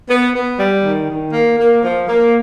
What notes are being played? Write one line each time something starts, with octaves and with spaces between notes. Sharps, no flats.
B3
B3
G3
D#3
D#3
A#3
A#3
F3
A#3